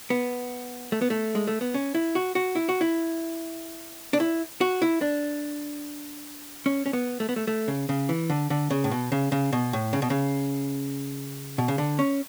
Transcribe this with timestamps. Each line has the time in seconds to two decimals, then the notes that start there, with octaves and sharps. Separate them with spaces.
0.10 B3
0.92 A3
1.01 B3
1.10 A3
1.35 G#3
1.47 A3
1.61 B3
1.74 C#4
1.95 E4
2.15 F#4
2.35 F#4
2.55 E4
2.69 F#4
2.81 E4
4.13 D4
4.20 E4
4.61 F#4
4.82 E4
5.01 D4
6.66 C#4
6.86 C#4
6.93 B3
7.20 A3
7.29 B3
7.36 A3
7.47 A3
7.68 C#3
7.89 C#3
8.09 E3
8.30 D3
8.50 D3
8.70 C#3
8.84 A2
8.91 B2
9.12 C#3
9.32 C#3
9.53 B2
9.73 A2
9.93 C#3
10.02 B2
10.10 C#3
11.58 B2
11.68 C#3
11.78 D3
11.99 C#4